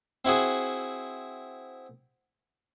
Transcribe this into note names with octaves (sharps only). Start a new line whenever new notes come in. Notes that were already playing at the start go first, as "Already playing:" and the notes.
C4 E4 F#4 G#4